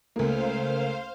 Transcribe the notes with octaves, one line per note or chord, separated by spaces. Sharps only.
C#2 A3 A#3 A4 C5 E5 F5